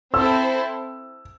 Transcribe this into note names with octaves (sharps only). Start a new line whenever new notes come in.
C4 E4 A4 C5 E6